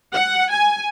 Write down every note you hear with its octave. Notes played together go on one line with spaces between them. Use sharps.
F#5
G#5